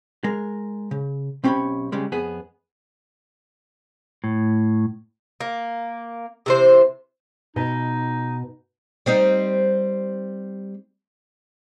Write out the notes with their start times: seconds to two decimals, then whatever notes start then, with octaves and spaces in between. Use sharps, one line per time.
0.24 G#3 A#4
0.91 C#3
1.44 B1 C4 C#4 G4 C#5 B5
1.92 C#3 G3 G#3
2.12 F2 B3 G#4
4.24 A2
5.40 A#3
6.46 C3 E3 C5
7.56 B2 D#4 D#5
9.06 G3 C4 D#4